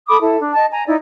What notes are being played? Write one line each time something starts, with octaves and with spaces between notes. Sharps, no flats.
A4 B5 D6 D#6
E4 A4
D4
D#5 A5
G#5 A#5
D#4 E4 D5